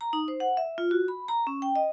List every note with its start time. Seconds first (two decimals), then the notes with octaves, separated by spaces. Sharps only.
0.01 A#5
0.13 D#4
0.28 C5
0.40 F#5
0.57 E5
0.78 F4
0.91 F#4
1.08 B5
1.28 A#5
1.47 C#4
1.62 G5
1.76 D#5